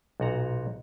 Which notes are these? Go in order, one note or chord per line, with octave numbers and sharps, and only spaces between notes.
B1 A#2 F#4 F#5 A#5